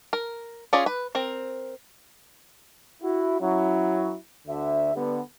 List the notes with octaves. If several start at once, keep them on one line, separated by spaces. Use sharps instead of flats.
A#4
C#4 F4 G#4 D5
B4
C4 A#4
E4 F#4
F#3 C#4 E4
D2 D3 E5
D3 G3 B3